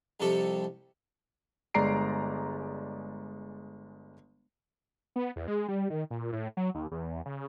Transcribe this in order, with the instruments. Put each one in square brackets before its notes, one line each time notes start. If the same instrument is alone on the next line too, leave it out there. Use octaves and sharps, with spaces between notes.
[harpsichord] C2 F2 C3 G3 A4 C#6
[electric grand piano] G1 G#3 D5 A#5 C7 D7
[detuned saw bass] B3
E2
G#3
G3
D#3
A#2
A2
F#3
D#2
E2
C#3